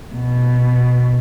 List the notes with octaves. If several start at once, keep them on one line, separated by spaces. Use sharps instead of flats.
B2